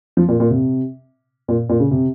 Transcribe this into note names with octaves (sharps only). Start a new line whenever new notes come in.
F3
A#2
A#2
C3
A#2
A#2
C#3
C3